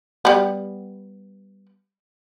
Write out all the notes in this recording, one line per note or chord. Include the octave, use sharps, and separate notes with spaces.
G3 B3